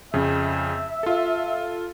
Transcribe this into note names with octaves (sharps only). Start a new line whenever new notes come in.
F2 C#3 E5
F4 A4